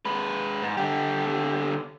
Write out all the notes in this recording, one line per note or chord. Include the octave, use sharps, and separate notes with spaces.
G#3 B4
G#2
D3 G4